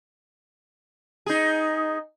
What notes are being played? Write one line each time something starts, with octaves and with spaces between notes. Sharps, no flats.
D#4 G#4